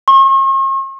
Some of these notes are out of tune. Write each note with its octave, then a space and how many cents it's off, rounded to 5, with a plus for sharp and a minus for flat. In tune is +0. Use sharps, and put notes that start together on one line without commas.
C#6 -45